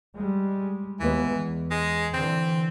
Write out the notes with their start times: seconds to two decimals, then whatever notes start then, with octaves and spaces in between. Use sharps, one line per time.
0.15 G3 G#3
1.00 D#2 E3 G#3 B3
1.31 E2
1.71 G#3
2.14 D3 E3 C4